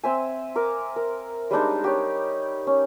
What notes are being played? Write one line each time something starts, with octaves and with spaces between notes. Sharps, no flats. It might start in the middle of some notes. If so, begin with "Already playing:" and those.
C4 E5 G#5
A#4 D6
A#4
G3 G#3 D4 D#4
G4 C#5
C#4